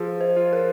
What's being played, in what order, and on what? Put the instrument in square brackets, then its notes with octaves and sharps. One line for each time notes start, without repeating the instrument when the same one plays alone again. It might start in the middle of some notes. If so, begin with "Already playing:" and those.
Already playing: [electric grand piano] F3 [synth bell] G#4
[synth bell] C5
[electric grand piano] F4
[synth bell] A#4